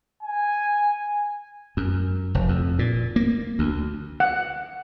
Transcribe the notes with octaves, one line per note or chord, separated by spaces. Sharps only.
G#5
F#2
F1
F2
A#2
A#3
D2
F#5